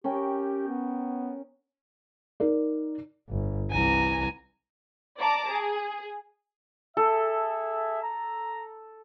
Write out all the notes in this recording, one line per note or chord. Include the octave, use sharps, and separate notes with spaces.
C#4 G4 A#4 G5
B3
D#4 A#4 D5
G1
C2 E3 G#5 A#5
D5 A5 A#5 D6
G#4
G#4 A4 E5
A#5